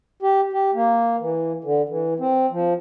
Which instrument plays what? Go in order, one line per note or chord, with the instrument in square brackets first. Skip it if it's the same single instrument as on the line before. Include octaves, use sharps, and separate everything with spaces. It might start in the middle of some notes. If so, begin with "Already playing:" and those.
[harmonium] G4
G4
A#3
E3
D3
E3
C4
F3